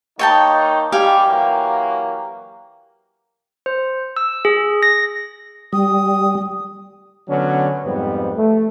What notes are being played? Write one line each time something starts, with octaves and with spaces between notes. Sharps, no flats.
D#3 A#3 D#4 C#5 G5 A5
D#3 G3 G4 F5 G#5
E3 F#3 A#3
C5
E6
G#4
A#6
G3 D#6
D3 F#3 B3 C#4
F2 G#2 G3 B3
A3